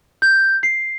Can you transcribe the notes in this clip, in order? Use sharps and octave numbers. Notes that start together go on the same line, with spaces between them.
G6
C7